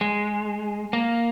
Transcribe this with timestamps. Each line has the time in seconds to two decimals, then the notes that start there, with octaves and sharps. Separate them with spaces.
0.01 G#3
0.93 A#3